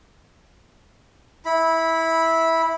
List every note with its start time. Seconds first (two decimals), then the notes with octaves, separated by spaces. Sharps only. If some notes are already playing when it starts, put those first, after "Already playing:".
1.45 E4 B5